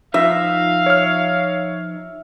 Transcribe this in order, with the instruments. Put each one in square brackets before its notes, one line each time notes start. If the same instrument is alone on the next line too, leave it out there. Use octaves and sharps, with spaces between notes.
[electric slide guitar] F3 D#4 [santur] E5 [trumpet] F5
[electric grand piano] C#5 F6